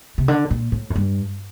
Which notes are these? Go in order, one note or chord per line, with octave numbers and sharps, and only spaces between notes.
C3
D3
A#2
A2
F#2
G2